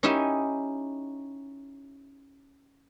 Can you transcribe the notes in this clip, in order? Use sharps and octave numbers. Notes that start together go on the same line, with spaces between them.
C#4 D#4 E4 G4 E5